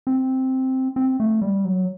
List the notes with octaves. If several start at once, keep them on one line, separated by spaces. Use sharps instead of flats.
C4
C4
A3
G3
F#3